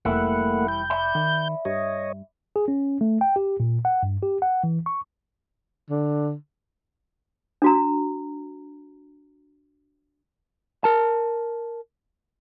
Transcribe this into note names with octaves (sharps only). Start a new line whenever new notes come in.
F1 E3 G3 A3 A#3 E4 F#5
G6
D5 E5 B5
D#3
G2 C#5 D#5
G#4
C#4
A3
G5
G4
A#2
F#5
G2
G4
F#5
E3
C#6
D3
D4 F#4 A#5
A#4 A5